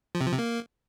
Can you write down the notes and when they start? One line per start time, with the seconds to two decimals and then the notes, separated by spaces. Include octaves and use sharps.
0.15 F3
0.21 C3
0.27 F3
0.33 C3
0.39 A#3